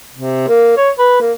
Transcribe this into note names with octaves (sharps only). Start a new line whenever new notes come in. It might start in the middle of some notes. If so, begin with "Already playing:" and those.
C3
A#3
C#5
B4
A#3